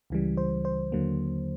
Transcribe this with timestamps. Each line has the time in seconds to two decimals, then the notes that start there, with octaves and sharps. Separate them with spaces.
0.10 C#2 C#3 E3 G3
0.37 C5
0.65 C5
0.92 D#2 D3 F#3 A#3